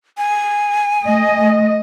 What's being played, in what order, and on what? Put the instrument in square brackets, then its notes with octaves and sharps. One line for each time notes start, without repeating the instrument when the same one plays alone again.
[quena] G#5
[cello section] A3 D#5